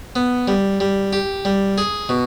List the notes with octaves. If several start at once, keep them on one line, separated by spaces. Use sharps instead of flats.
B3
G3
G3
G4
G3
G#4
B2